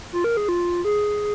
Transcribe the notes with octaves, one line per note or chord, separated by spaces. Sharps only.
F4
A#4
G#4
F4
G#4